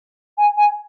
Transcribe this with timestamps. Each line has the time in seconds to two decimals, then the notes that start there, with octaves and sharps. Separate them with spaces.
0.37 G#5
0.57 G#5